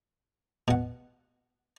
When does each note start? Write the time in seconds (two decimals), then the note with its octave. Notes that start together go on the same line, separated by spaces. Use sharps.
0.68 B2 F#5